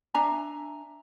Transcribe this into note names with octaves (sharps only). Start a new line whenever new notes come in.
D4 E5 G#5 A#5